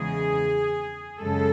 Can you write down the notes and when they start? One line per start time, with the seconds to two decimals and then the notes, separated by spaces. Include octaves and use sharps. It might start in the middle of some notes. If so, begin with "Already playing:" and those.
Already playing: E2 C#3 G#3 G#4
1.21 F#2 C#3 G#3 A4